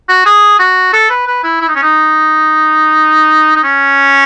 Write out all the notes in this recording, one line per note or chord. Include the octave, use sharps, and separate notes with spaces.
F#4
G#4
F#4
A4
B4
B4
E4
E4
D#4
C#4
D#4
D#4
C#4